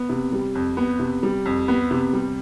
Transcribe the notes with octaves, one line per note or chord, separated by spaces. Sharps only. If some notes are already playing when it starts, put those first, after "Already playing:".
Already playing: B3
C3
G3
F2
B3
C3
G3
F2
B3
C3
G3